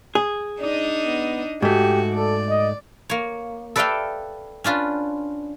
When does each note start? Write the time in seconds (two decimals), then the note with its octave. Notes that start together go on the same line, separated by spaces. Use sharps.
0.15 G#4
0.61 D4 D#4 D5 D#5
1.05 B3
1.62 G#2 A3 F#4 G4
2.15 A4 D5
2.49 D#5
3.09 A#3 C#5
3.76 A4 B4 D5 E5 F5 G5
4.64 C#4 D4 F4 B4